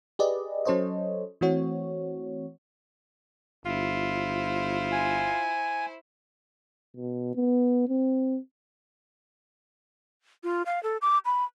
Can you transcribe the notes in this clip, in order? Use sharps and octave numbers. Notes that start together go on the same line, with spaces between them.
G4 G#4 B4 D5 D#5
F#3 C#4 A4 C5 C#5 D#5
E3 A3 C4 F#4 C#5
G1 E4 F4 C5
G#5
B2
B3
C4
F4
F5
A4
D6
B5